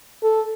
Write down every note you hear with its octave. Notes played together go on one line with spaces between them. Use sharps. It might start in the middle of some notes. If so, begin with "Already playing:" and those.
A4